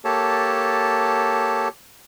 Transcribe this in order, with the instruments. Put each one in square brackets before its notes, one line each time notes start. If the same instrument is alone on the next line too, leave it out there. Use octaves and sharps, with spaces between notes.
[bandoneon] A#3 G4 A4 C#5 A5